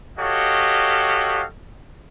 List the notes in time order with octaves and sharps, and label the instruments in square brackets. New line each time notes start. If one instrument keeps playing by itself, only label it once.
[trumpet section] F#4 G4 A4 C#5 D#5 F5